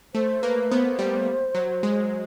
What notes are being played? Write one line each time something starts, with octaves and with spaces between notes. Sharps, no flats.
A3 C5
A#3 B4
B3 C5
G3
F#3
G#3